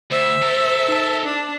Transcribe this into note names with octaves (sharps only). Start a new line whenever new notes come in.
D2 C5 E5
A4 A#4
D#4 A5
D4